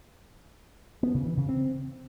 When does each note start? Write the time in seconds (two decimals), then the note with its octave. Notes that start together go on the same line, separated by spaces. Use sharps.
1.03 B3
1.14 C#3
1.26 E3
1.37 C#3
1.49 C4